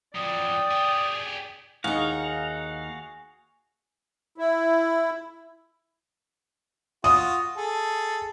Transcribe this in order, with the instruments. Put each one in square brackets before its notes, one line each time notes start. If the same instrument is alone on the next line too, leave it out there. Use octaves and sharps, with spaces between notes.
[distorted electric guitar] F2 F#3 [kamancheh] D5 G5 [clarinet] D#6
[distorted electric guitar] G4 G#4
[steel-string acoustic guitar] D#2 D#4 [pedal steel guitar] F#4 F5 [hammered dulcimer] G#4
[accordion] E4
[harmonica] F4 F#4 [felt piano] D#6
[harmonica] G#4 A4